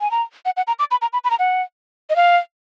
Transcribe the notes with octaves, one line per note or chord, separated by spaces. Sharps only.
G#5
A#5
F#5
F#5
A#5
D6
B5
A#5
B5
B5
A#5
F#5
D#5
F5